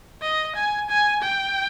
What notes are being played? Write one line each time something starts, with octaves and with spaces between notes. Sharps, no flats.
D#5
G#5
G#5
G5